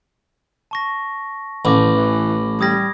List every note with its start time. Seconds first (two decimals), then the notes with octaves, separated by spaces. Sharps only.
0.71 A5 C#6 A#6
1.65 A1 B5 D6 A#6
1.96 E3
2.61 G3 D#6 G#6 A#6